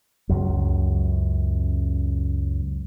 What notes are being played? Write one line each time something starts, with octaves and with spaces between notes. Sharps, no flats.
C#2 F#2